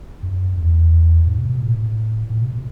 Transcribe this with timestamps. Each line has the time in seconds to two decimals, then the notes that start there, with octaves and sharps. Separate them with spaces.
0.23 F#2
0.57 E2
1.27 G#2
1.38 B2
1.49 B2
1.61 A2
2.30 A2
2.42 B2
2.53 B2